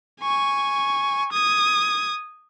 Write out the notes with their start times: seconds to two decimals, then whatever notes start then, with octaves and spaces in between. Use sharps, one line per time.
0.22 G#5 C#6
1.33 D#6 G#6